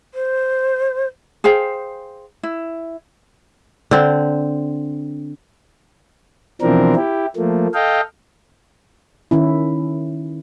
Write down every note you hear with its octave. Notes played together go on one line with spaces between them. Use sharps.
C5
G#4 C5 F5 G5
E4
D3 C4
B2 E3 F3 C4 D4 A#4
E4 G4
F3 A3 A#3
A4 D#5 F5 G5
D#3 C#4 E4